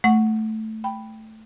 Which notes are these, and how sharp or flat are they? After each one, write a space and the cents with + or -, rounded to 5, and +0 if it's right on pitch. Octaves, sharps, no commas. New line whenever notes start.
A3 +0 F#5 +0 C#6 +0
G5 +0 B5 +0